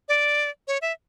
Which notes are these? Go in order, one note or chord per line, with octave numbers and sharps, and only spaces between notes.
D5
C#5
E5